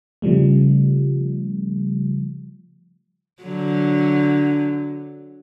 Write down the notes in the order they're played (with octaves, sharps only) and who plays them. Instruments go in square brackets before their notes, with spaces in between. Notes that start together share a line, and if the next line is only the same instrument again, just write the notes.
[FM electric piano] C#3 F3 G3 A3
[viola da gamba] D3 F#3